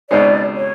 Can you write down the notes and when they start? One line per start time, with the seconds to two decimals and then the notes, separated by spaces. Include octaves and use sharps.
0.10 C#2 B2 G#3 C4 D#4 D5
0.56 C#5